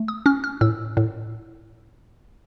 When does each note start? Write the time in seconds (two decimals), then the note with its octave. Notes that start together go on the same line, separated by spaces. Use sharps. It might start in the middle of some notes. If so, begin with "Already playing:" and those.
Already playing: A3
0.08 D#6
0.26 C#4 F6
0.44 F6
0.61 A2 E6
0.97 A2